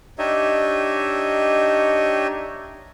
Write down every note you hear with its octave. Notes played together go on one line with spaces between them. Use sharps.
D4 D#4 G4 C#5 D#5 E5